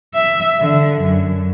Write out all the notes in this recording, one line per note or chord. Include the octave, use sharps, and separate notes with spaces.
E5
D3
F#2